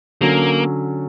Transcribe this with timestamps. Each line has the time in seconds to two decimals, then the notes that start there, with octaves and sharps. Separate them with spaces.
0.21 D3 F#3 A#3 C#4